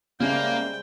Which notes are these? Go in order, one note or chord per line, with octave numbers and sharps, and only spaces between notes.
C#3 G3 G#3 A#3 C5 E5 G5